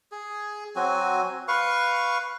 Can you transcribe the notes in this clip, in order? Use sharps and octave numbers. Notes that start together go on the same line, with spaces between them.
G#4
F#3 C4 F#4 G#5
B4 F5 C#6